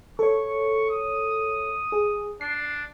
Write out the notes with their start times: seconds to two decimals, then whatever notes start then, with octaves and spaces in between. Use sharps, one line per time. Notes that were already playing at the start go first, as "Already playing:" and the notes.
0.19 A4 C#5 C#6
0.90 D#6
1.92 G#4
2.41 D4 C7